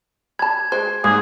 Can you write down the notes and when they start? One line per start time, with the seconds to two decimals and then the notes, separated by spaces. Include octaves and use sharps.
0.39 A5 B5 G#6
0.72 G#3 C5
1.04 G#2 A#3 G#4